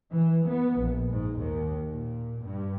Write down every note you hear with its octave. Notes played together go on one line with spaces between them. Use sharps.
E3
B3
A#1
G#2
D#2
A#2
G2